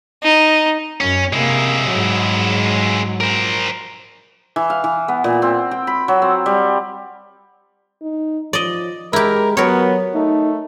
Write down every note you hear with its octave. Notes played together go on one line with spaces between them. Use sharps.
D#4
F#2 C#4
C3 G#3 A#3 E4
G#2 F#3
A#4 C5
E3
F5
E3
B3
A#2
C4
G5
B5
F#3
C4
G3
D#4
F3 D5 D#5
G#3 E4 G4 A#4
F#3 B3 A#4 C#5
A3 D#4